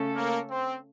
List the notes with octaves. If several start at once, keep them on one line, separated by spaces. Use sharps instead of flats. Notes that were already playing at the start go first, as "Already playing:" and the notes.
Already playing: C#3 A3 C#4 A4
A#3
C4